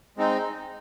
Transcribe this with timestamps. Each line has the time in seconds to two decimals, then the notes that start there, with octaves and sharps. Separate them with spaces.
0.17 G#3 C4 D#4